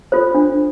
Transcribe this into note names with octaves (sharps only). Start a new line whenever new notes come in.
F4 A4 C5
D4